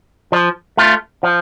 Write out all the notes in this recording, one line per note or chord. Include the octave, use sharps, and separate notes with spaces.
F3
A3 F4
F3